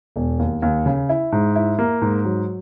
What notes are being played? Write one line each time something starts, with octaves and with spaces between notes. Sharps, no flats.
E1
D#2
D#2
C#3
E4
G#2
E4
A#3
G#2
F#3